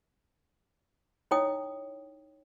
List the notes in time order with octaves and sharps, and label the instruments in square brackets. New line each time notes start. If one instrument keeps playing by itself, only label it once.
[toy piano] D#4 E4 C#5 D#5 G5 D#6